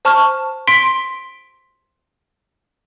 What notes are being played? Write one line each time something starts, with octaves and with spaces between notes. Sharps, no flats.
C5 A5 C#6 F6
C6 B6 D7